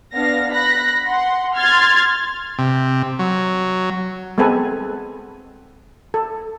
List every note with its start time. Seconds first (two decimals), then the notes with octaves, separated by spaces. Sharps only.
0.13 B3 D4 F5 A#6
0.51 B5 F#6 A#6
1.06 F#5 C6
1.55 C6 F6 G#6 A6
2.58 C3
3.19 F#3
4.38 G#3 B3 C4 A4 B4 G#5
6.14 A4